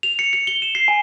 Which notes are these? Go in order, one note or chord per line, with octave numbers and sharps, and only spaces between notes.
F7
C#7
C#7
G7
E7
C7
G#5